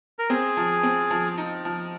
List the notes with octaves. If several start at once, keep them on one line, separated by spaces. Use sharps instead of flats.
A#4
C4 G#4
F3
C4
F3
D#4
F3